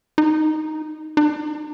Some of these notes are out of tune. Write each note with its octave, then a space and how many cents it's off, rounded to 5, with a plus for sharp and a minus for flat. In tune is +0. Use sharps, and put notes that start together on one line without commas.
D#4 +0
D#4 -45